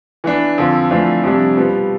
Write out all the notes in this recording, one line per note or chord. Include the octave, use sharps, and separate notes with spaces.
E3 B3 D4
F2 D3 F3
F2 E3 A3 D4 F4
F2 C3 G3 D4
B2 G3 B3 F4